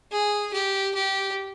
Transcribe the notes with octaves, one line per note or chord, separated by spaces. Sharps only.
G#4
G4
G4